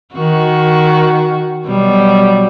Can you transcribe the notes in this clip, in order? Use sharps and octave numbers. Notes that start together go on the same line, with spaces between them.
D#3 F#4
B2 F#3 G3